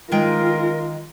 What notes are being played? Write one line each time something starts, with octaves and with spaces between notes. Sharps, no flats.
D#3 G#3 F4 A#4 G5